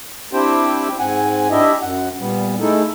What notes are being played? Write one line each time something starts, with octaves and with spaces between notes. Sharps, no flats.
C4 D4 E4 G4 C5 G5
G#2 C4 F#5 G#5
D4 E4 G4 D#5 E5
F#2 F#5
A#2 G3 B3
G#3 A3 D#4 E4 A4